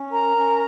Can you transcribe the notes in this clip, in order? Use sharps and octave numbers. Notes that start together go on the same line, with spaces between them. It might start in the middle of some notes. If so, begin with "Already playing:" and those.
Already playing: C#4
A#4 A#5
C#4